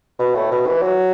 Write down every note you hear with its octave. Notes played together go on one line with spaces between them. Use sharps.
B2
A2
B2
E3
F#3